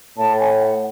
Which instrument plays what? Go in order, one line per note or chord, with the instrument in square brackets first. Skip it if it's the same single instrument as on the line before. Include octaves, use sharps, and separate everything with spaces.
[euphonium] A2 [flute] A5
[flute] G#5
F#5